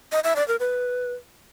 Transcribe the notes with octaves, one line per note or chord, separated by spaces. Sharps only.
D#5
E5
D5
A#4
B4